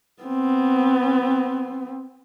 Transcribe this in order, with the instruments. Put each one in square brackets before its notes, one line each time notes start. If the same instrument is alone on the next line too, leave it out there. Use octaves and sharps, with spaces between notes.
[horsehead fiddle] B3 C4